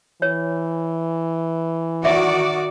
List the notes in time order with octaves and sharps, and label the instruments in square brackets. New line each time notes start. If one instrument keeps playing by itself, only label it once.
[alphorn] E3 [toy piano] C#5
[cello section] D#3 F#4 D5 [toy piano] E5